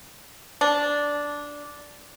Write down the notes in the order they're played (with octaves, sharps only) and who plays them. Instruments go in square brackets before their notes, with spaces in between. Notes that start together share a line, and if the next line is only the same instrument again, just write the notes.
[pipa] D4